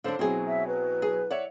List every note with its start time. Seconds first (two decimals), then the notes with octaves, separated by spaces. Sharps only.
0.04 D3 F#3 D4 C5 F5
0.19 B2 F#3 C4 E4 G#4
0.47 E5
0.67 B4
1.02 G#4
1.31 C#5 D5 E5 F#5